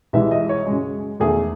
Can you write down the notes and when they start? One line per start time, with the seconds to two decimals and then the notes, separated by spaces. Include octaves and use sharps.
0.13 C2 C3 E3 G#3 E5
0.31 D#5
0.49 C#5
0.66 F#2 C#3 G#3
1.20 E2 D#3 A3 G#4